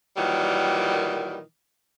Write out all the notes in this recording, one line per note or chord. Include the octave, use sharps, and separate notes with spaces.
A#2 D#3 E3 F#3 G3